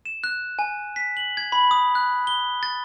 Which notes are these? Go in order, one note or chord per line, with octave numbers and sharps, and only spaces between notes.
E7
F#6
G#5
B6
F#7
G#6
B5
D#6
F#6
G7
A6